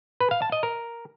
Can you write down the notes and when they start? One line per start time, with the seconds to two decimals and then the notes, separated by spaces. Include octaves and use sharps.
0.20 B4
0.31 F5
0.42 A5
0.52 D#5
0.63 A#4